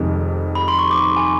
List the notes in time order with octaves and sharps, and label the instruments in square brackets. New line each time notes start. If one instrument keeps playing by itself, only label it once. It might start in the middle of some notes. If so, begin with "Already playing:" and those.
Already playing: [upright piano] F1 F2 C3 D#3 G#3
[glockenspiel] B5
C6
C#6
D6
G#5